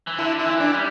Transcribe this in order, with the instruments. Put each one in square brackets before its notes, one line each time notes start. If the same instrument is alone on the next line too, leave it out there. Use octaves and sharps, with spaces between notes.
[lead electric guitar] E3
[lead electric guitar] D3 [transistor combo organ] E4
[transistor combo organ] E4
[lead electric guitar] E3
[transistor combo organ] D4
[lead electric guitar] G3